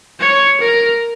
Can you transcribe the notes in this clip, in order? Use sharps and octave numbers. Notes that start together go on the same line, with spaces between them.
C#5
A#4